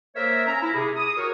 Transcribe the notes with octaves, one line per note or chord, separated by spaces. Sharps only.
A#3 A#4 C5 C#5 E5
C#4 A#5
E4
C3 G#4
D#6
F#4 A#4 C#5